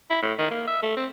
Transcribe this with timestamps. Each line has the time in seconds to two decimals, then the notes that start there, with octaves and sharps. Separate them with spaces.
0.10 E4
0.22 A2
0.39 D#3
0.51 A#3
0.67 E5
0.83 A3
0.97 C4